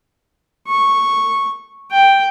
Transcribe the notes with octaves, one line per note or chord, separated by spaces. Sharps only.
C#6
G5